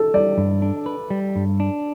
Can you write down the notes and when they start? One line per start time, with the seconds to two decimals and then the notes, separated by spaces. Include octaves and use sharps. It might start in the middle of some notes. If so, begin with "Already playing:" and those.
Already playing: A4
0.14 G3 D5
0.38 G2
0.62 D4
0.86 B4
1.10 G3
1.36 G2
1.60 D4